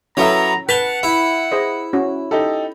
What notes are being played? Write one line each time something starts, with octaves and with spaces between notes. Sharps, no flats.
F#3 B3 C#4 E4 A4 E5 A#5
B4 F#5 A5 B6 F7 G7
E4
G#4 C5 D#5
C#4 F#4
D#4 G4 A4